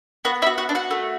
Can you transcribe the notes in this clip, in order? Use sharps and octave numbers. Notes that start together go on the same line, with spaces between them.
B3 F#4 F#5
E4 E5
F#4
F#4 F#5
D4
F#4 F#5
A3